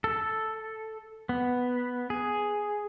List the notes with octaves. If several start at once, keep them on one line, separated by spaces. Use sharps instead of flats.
A4
B3
G#4